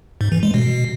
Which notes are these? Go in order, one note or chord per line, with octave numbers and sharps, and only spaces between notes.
G#2
E3
G#3
B2